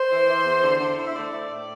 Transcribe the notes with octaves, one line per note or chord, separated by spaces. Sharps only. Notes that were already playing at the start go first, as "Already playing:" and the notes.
Already playing: C5
E3
E3
E2
D3
D3
E4
E5
A3 D5
A3
A2